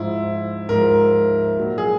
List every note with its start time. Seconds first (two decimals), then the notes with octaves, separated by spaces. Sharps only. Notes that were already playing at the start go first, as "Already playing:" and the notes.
Already playing: G#2 F3 E4
0.69 G#2 F3 A#4
1.57 A#2 F#3
1.78 G#4